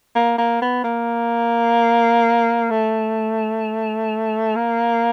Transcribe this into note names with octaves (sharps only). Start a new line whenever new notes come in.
A#3
A#3
B3
A#3
A3
A#3